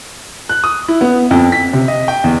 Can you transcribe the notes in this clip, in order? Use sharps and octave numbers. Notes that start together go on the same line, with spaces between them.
F#6
D#6
E4
B3
F2
B6
C3
D#5
G5
E2